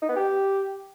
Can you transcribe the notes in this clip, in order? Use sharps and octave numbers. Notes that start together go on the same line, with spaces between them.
D#4
B3
G4